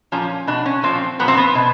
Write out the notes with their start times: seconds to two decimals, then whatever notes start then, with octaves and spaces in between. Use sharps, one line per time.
0.12 A#2 F3 C#4
0.47 B2 D4
0.66 C#4
0.83 A#2 F3 C4
1.19 A#2 F3 B3
1.28 C4
1.37 B3
1.55 B2